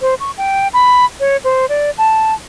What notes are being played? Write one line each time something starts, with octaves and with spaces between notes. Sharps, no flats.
C5
C#6
G5
B5
C#5
C5
D5
A5